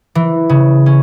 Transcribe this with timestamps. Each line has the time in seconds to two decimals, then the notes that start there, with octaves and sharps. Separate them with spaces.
0.15 E3
0.49 C#3
0.86 C#4